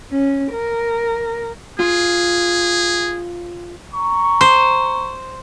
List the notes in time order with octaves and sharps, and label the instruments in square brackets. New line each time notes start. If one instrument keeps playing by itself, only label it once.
[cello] C#4
A#4
[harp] F4 [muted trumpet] G#4
[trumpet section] A#5 C#6
[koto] C5